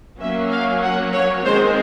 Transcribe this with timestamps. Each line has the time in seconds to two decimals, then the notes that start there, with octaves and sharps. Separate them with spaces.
0.20 F#3 A#3 C#4 E5
0.51 F5
0.82 F#5
1.13 C#5
1.44 D#3 G#3 C4 C5